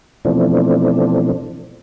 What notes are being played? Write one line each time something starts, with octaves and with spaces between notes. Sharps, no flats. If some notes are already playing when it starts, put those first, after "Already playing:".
B2 E3 F3 A3 C4 D4